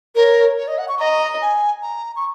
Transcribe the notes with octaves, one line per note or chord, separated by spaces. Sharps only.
A#4 C#5
C#5
D#5
F#5
C#6
D#5 A#5
G#5
A#5
C#6